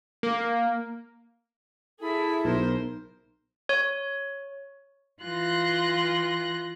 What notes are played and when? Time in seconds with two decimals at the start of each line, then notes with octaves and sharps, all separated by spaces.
0.23 A#3
2.00 E4 G#4 A4 B5
2.44 B1 A#4 C5
3.69 C#5
5.22 E3 F4 C6 F#6 A#6